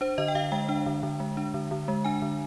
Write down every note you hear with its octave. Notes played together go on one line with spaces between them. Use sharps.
D4 C5
D3 D#5
G5
D3 F5
G#3 G5
D4 G5
D3
D3
G#3
D4
D3
D3
G#3
D4 G#5
D3